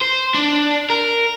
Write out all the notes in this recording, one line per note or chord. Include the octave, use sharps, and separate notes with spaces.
C5
D4
A#4